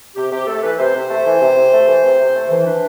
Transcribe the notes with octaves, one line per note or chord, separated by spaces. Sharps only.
C3 G4
C3 G4
A3 A4
E3 B4
C3 C5
C3
A3
E3
C3
C3
A3
E3
C3
C3
A3
E3
D4 B4